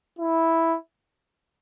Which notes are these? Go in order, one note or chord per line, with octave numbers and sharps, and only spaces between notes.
E4